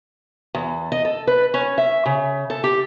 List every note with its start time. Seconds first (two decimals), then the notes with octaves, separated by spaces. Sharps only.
0.55 E2
0.92 D#5
1.05 A4
1.27 B4
1.54 C#4
1.78 E5
2.06 C#3
2.50 A4
2.64 G4